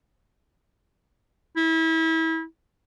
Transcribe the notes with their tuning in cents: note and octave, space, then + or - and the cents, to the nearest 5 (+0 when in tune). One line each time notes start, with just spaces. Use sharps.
E4 -30